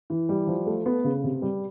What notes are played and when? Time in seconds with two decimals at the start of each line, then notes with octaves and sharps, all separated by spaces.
0.10 E3
0.29 G3
0.47 F3
0.66 A3
0.86 B3
1.04 C#3
1.24 C3
1.42 G3